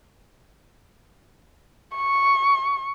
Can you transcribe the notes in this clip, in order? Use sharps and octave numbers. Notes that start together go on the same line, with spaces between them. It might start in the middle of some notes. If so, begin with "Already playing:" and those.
C#6